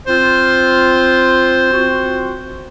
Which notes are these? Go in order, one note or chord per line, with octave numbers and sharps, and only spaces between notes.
C4 F4 C5
C4 F4 F#4